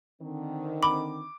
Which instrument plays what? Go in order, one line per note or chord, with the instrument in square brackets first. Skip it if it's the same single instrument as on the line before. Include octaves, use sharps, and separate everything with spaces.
[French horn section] D3 D#3 C4
[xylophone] B5 [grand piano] D6